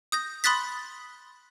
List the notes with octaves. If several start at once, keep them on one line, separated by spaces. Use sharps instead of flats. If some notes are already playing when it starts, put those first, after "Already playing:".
D#6 G6 A#6
B5 C6 D#6 F#6 A6 B6